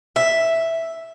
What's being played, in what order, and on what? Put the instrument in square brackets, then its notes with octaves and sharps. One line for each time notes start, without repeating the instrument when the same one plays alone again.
[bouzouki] E5